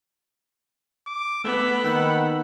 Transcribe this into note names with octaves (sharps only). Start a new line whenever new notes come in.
D6
A3 B3 B5 E6
D#3 A#3 F#5 G5 E6